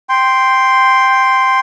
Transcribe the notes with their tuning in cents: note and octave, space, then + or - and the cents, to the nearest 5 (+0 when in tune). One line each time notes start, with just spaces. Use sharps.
G5 +0 C6 +0